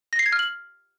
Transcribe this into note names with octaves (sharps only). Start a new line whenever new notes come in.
A#6
C7
G#6
F6
F#7